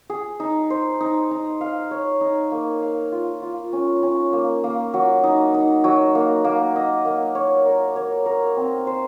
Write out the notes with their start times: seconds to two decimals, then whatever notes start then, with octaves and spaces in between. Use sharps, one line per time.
0.10 G#4
0.40 D#4
0.70 C5
1.01 D#4
1.31 D#4
1.61 F5
1.91 C#5
2.21 D#4
2.52 A#3
2.82 F5
3.12 F4
3.42 F4
3.73 C#4
4.03 C#4
4.33 A#3
4.64 A#3
4.94 F#3
5.24 D#4
5.54 D#4
5.84 F#3
6.15 A#3
6.44 A#3
6.76 D#5
7.05 A#3
7.35 C#5
7.66 A#4
7.96 C#5
8.26 A#4
8.56 C4
8.87 C5